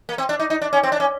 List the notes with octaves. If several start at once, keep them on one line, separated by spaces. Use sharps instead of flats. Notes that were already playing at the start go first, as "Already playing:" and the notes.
A#3
C4
D4
D#4
D#4
D4
C#4
C4
D4
C#4